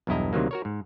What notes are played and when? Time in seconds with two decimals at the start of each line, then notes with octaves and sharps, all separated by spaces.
0.07 B1 E2 G2 E4 D#5 A#5
0.33 D2 C3 D#3 F#3 A#3
0.51 F#4 A#4 C#5
0.65 G#2